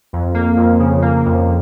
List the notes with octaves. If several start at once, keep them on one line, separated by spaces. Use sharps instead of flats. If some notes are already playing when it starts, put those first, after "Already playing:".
F2
A#3
F2
C#3
A#3
F2